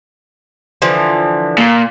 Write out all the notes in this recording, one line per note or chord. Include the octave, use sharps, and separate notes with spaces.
D3 E3 F3
A#2